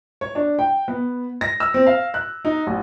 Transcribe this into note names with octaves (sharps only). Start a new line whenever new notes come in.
C#5
D4
G5
B3
A#6
E6
C4
F5
F#6
D#4
A1